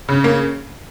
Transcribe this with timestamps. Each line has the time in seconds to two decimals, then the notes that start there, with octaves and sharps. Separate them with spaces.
0.09 C#3
0.24 A#3